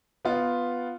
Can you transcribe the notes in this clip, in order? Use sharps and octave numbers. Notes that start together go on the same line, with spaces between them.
B3 F4